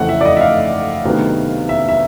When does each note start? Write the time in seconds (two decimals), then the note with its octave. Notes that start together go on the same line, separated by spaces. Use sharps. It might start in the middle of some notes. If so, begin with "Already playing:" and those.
Already playing: F2 C#3 E3 A3 F#5
0.09 E5
0.21 D5
0.25 D#5
0.36 E5
0.41 F5
1.05 D2 C3 D#3 F#3 B3
1.69 E5
1.88 E5